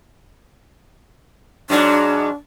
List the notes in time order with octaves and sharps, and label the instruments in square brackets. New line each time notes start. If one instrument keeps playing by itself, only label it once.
[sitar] G#2 F#3 [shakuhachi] D4